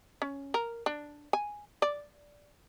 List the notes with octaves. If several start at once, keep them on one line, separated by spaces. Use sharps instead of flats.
C#4
A#4
D4
G#5
D5